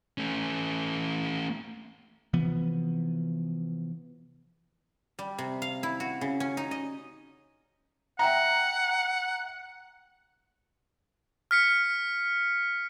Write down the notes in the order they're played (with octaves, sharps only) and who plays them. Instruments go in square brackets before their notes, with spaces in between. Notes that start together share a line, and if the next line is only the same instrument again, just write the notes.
[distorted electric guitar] A3 C#4
[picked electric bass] C3 E3 F3 B3
[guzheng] G3
C3
F5
E4
F#4
C#3
C#4
D#4
D#5
[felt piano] E5 G5 A#5 [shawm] F#5
[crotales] F6 B6 C#7